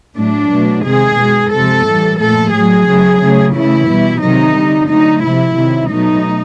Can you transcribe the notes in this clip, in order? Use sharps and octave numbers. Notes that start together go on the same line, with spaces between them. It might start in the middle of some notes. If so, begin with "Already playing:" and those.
A2 F#3 A3 D4
B2 F#3 A3
C3 D#3 G#3 G#4
B2 G#3
C3 F3 G#3 A4
A2 E3 G3
A#2 F3 A3 A4
A2 F#3 A3 G#4
C#3 F#3 A3
C#3 F#3 A3
C#3 E3 A3 E4
B2 G3
C3 D#3 F#3 D#4
D3 G3
D3 F#3 A3 D#4
C3 F3 A3 E4
C3 D#3 F#3
B2 F#3 A3 D#4